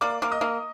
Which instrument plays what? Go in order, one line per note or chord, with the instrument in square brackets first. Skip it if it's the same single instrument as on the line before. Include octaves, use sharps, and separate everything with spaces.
[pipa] A#3 [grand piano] D5 D6
[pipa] A#3 [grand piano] D6
[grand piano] D#5 D#6
[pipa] A#3